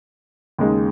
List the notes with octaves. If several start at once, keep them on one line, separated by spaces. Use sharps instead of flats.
D#2 C#3 G#3 D#4